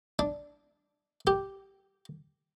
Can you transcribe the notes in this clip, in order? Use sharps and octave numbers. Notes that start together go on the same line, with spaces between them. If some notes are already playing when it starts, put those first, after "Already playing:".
D4
G4